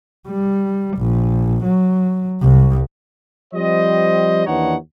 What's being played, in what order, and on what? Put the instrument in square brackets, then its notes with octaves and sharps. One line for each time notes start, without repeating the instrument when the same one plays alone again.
[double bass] G3
A#1
F#3
C2
[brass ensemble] F3 G3 C4 C5 D#5
D#2 E3 D4 D#4 C#5 F#5